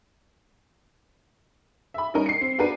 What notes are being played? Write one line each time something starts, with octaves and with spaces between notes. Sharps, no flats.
E5 B5
G3 C#4 D#4 A#4
C7 C#7
C4
B3 D4 F#4 G4 A#4 B4